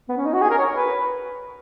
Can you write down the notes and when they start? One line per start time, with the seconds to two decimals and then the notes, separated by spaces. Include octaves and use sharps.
0.09 B3
0.17 C#4
0.25 D#4
0.33 F#4
0.41 G#4
0.50 A#4
0.58 C#5
0.74 B4